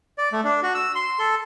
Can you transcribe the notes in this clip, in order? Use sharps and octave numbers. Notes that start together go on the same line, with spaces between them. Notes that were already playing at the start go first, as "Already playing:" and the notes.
D5
A3
D4
F#4
E6
C6
A4